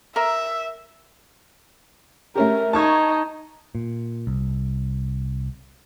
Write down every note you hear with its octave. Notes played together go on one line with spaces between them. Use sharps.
A#4 E5
A3 C#4 G4 A#4
D#4 A5 C#6 G#6
A#2
C2